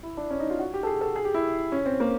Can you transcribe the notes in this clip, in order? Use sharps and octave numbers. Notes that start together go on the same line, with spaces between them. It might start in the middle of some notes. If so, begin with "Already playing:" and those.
E4
D4
C#4
D#4
F4
F#4
G4
A4
G#4
A4
G#4
G4
E4
C#4
C4
A#3